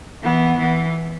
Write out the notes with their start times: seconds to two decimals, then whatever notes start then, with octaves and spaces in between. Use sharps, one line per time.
0.23 E3 B3
0.58 E3